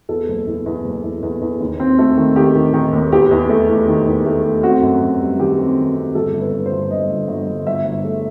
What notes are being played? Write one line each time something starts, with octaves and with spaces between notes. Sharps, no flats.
E2 A4
F#1
E2
E2
F#1
E2
E2
E2
D#2
C4
A3 A4
D#3
D#3 G4
D#3
D#3
D#2
E2 G4
E2
A3
E2
D#3
E2
A3
A3
C4 F#4
F#2
F#2
G3
D#3 G4
C4
D#3
C4
G1 A4
G1
B4
G2
C5
G1
G1 D#5
G1
G1
G1
G1 E5
G1
A3